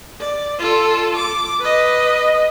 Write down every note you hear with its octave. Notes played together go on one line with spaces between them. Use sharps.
D5
F4 A4
D6
B4 D#5